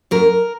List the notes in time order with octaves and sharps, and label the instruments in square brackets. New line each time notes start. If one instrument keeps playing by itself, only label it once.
[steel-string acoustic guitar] F#2 A#4